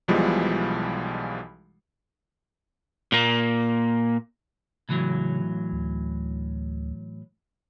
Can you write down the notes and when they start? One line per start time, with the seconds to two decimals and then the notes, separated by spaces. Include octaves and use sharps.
0.08 B1 B2 E3 F3 G3 G#3
3.12 A#2 A#3
4.89 A2 C#3 E3 F#3
5.72 D2